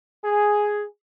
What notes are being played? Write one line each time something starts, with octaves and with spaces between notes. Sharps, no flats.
G#4